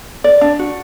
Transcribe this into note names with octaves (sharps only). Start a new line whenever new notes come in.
D5
D4
F#4